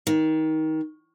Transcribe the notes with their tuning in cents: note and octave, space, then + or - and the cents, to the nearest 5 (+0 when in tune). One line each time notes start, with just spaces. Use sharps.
D#3 +20